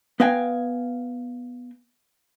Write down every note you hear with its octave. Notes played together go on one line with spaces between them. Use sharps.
B3 B4 D#5 F5 G5 G#5